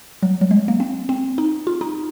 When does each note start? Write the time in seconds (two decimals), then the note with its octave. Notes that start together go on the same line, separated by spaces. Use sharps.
0.23 F#3
0.41 F#3
0.51 G#3
0.68 A#3
0.80 C4
1.09 C4
1.38 D#4
1.67 F4
1.81 D#4